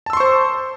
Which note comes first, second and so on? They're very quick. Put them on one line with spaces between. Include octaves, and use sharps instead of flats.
A5 E6 C6 C#6 C5